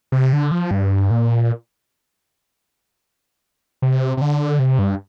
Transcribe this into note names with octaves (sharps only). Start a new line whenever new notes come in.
C3
D3
F3
G2
A#2
C3
C3
D3
C3
G2